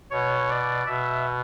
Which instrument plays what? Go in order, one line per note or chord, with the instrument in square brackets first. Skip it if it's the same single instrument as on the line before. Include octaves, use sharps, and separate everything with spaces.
[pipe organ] B2 C#5
D5
B2 E5